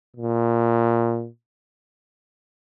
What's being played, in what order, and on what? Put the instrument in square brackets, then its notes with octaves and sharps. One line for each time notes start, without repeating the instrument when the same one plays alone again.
[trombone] A#2